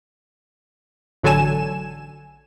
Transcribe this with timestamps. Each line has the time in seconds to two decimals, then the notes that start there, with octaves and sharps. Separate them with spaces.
1.23 A1 D3 F#3 A4 G#5 E7